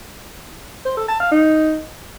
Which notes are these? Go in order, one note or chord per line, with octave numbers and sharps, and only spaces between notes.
C5
A4
A5
F5
D#4